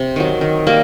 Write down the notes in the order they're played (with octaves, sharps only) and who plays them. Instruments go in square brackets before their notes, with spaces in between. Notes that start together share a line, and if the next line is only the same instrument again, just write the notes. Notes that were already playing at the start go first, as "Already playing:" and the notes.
Already playing: [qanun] C3
D#3 F#3
D#3
G3 A#3